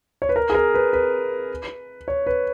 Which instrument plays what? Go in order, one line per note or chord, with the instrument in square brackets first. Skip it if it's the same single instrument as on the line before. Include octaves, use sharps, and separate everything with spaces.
[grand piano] C#5
B4
A#4
G#4
A#4
B4
B4
C#5
B4